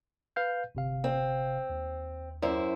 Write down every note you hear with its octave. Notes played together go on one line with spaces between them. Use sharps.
B4 F5 G6
G1 C3 F5
C4
D#2
F#2 E4 C5